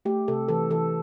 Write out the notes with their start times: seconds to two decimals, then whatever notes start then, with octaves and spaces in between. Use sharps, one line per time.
0.05 A3 G4
0.28 C3 A4
0.49 E3 A4
0.70 E3 A4